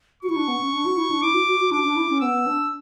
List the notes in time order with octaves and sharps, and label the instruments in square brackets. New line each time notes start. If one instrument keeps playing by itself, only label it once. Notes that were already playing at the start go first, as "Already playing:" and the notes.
[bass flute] F#4 [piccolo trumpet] C#6
[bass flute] E4
D4
B3
C#4
D4
F#4
E4
D4
[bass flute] E4 [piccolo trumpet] D6
[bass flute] F#4
F#4
F#4
[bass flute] D4 [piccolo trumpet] D6
[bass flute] D4
E4
C#4
[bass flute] B3 [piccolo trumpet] E6
[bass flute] D4